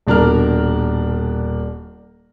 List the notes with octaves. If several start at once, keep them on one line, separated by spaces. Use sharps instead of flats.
D#1 B2 D4 A#4 D5 F6